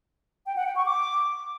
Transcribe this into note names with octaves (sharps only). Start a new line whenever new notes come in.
G5
F#5
G5
C#6
D6